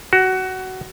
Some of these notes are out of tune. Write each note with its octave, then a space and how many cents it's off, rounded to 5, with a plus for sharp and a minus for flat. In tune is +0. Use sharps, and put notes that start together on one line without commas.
F#4 +20